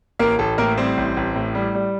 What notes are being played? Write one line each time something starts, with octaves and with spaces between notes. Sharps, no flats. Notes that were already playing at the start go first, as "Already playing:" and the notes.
A1 A#3 A#4
A1 A4
A2 A#3 A#4
G3 C4 C5
A1
A1
A2
G3
G3